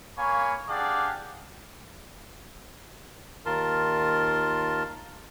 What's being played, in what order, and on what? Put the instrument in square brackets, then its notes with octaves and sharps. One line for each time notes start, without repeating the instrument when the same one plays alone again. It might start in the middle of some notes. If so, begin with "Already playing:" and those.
[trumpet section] A#3 C#5 F5 G#5 B5 C#6
D4 G4 G#4 D5 F5 F#5
[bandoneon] D#2 D#3 F4 A#4 A5 C6